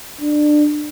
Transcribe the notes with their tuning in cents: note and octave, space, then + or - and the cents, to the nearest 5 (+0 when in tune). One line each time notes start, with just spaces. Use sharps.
D4 +20